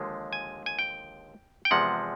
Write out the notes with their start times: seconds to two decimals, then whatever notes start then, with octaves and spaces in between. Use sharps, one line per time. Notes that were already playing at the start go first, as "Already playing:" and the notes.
Already playing: D#2 D3 F3 G#3
0.33 G#5
0.66 G#5
0.79 G5
1.65 G5
1.71 E2 C3 F3 G#3 F#5